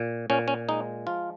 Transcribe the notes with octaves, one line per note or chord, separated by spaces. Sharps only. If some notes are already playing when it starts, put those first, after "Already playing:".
Already playing: A#2
A#2 C#4
C#4
G#3 D#4
F3 F4